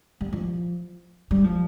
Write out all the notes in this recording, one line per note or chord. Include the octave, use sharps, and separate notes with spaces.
G3
F3
G3
F3